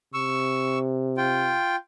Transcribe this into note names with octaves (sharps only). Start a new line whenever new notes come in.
C3 C#6 E6
F4 G5